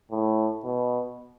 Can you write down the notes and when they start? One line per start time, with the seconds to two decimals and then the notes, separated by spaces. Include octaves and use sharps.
0.11 A2
0.64 B2